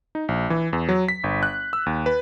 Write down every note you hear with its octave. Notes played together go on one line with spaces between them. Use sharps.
D#4
A#1
E3
E2
F#3
B6
G1
F#6
E6
D#2
B4